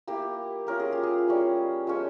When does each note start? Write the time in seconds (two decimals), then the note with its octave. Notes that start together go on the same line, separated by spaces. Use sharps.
0.07 A#3 E4 G4
0.67 A#3 C#4 F4 A#4
0.79 G#4
0.92 G4
1.03 G#4
1.28 G3 C#4 E4
1.87 F3 G#3 C#4 G5